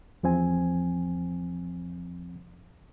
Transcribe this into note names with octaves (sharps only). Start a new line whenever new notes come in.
E2 F3 C4 G#5